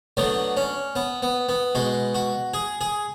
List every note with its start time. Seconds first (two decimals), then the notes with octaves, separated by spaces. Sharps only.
0.17 D3 F#3 A3 B3
0.57 C#4
0.96 B3
1.23 B3
1.49 B3
1.75 B2 G#3 F#4
2.15 F#4
2.54 G#4
2.81 G#4